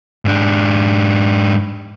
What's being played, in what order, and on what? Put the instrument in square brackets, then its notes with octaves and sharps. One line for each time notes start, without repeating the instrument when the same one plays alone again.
[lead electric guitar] G#2 D4